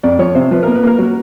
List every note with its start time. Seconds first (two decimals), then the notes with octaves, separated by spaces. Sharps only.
0.03 F2 D5
0.19 F3 C#5
0.35 C3 C5
0.51 F3 B4
0.63 A#4
0.67 A#3
0.74 B4
0.83 A#3 A#4
0.98 F#3